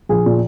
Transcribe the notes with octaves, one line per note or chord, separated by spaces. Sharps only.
A#1 G#4
A#2